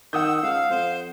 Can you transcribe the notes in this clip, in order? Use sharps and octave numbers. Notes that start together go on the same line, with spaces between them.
D#3 F#5 D#6 E6 G6
C#2 F5
F2 C5